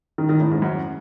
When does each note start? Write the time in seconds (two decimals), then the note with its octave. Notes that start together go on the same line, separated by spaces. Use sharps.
0.18 D#3
0.29 D#3
0.40 A2
0.51 G#2
0.62 F#2